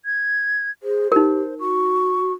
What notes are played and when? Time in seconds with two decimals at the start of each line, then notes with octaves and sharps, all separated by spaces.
0.05 G#6
0.83 G#4 C5
1.12 D#4 G4 A#4
1.60 F#4 C#6